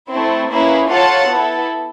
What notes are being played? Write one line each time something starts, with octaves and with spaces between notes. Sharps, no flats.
A3 C4 E4
A#3 C#4 E4 G#4 B4
F4 A4 C#5 F#5 A5
B3 E4 A4